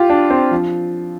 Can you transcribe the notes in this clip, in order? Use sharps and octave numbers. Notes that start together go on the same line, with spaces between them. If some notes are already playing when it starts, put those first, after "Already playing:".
Already playing: F4 G4
D4
C4
F3